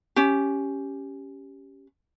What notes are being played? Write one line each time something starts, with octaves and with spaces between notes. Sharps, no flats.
C#4 G4